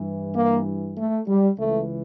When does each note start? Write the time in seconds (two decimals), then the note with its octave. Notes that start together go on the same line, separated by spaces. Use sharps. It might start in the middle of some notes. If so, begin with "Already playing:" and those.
Already playing: G2 E3
0.35 A#3
0.97 A3
1.28 G3
1.58 C#2 C#3 E3 A3